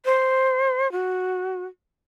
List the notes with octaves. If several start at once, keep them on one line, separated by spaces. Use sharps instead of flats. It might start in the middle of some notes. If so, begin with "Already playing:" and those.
C5
F#4